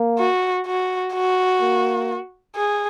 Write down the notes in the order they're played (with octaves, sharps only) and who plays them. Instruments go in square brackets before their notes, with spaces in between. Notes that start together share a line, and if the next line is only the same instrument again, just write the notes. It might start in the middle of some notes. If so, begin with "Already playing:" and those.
Already playing: [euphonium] A#3
[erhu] F#4
F#4
F#4
[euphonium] A#3
[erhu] G#4